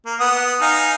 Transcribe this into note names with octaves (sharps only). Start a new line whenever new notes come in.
A#3
B3 F#5 D#6
D#4 F5 G#5